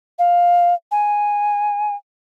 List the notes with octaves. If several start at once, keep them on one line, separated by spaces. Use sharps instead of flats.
F5
G#5